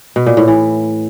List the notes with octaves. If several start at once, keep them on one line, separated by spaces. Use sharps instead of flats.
B2
A#2
A2
E3